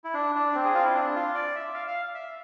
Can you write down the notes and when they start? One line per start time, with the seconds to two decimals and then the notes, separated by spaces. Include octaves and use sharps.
0.04 E4
0.14 D4
0.35 D4
0.55 C4
0.64 G#4
0.74 F4
0.84 E4
0.94 D4
1.15 F4
1.35 D5
1.55 E5
1.74 F5
1.87 F5
2.14 E5